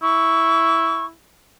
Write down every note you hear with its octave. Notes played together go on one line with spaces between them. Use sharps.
E4 C#6